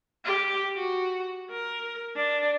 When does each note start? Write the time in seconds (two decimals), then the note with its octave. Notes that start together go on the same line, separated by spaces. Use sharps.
0.25 G4
0.77 F#4
1.50 A#4
2.16 D4